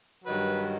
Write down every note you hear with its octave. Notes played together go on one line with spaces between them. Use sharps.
G2 D#3 F#3 B4